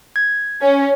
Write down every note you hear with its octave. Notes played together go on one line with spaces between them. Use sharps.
G#6
C#4